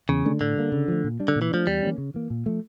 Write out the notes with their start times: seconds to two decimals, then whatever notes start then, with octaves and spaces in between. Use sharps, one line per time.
0.09 E2 C#3
0.25 D3 A3 D4
0.40 A2 D3
0.56 G3 A#3
0.72 C#3
0.88 F3 A3
1.04 A#2
1.20 G3 D4
1.28 D3
1.36 A#2
1.42 E3
1.51 F3 A3 D4
1.67 E2 G3
1.83 E3 A#3 C#4
1.98 C#3
2.14 E3 A#3
2.30 A#2
2.46 F3 A3